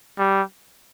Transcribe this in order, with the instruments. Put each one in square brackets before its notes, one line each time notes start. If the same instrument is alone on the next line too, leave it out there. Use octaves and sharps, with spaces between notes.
[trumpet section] G3